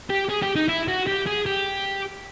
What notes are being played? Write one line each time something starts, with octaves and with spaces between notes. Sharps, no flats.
G4
G#4
G4
D#4
E4
F#4
G4
G#4
G4